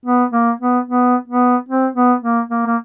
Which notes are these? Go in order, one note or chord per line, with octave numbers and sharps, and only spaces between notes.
B3
A#3
B3
B3
B3
C4
B3
A#3
A#3
A#3